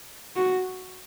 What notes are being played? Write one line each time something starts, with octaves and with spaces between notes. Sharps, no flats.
F#4